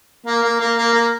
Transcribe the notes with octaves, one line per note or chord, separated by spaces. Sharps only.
A#3
A#3
A#3
A#3
A#3